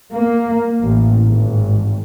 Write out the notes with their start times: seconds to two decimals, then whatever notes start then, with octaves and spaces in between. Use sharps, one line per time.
0.13 A#3
0.81 A1
1.26 G#1